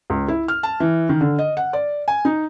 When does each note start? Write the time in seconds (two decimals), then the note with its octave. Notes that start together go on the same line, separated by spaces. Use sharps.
0.10 C#2
0.28 E4
0.48 F6
0.63 A5
0.80 E3
1.09 D#3
1.21 D3
1.39 D#5
1.57 F#5
1.73 D5
2.08 G#5
2.25 D#4